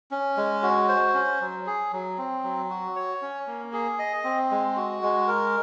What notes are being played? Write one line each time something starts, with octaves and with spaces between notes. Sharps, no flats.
C#4
G#3
F#4
C5
C#4
F#3
G#4
F#3
C4
F#3
F#4
C#5
C#4
A#3
G#4
D#5
C4
G#3
F#4
G#3
A#4